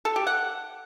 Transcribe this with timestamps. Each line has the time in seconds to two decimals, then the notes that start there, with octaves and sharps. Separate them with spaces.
0.05 A4
0.16 G4
0.27 F#5